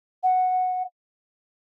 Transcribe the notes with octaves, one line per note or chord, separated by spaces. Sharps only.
F#5